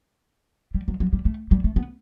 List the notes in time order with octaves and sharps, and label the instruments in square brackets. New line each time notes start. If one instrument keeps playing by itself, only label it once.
[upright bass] G3
F#3
F#3
G3
A3
G3
A3
B3